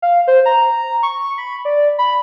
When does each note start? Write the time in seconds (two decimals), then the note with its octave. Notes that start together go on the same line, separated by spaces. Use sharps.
0.02 F5
0.27 C5
0.46 A#5
1.03 C#6
1.38 B5
1.65 D5
1.98 B5